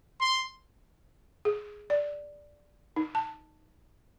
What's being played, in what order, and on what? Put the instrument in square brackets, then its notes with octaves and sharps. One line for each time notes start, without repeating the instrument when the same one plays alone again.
[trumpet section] C6
[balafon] G#4
D5
D#4
A5